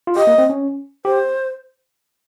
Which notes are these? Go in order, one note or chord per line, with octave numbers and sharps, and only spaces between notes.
F4
G4 D#5
A#3
C4
C#4
G4 C5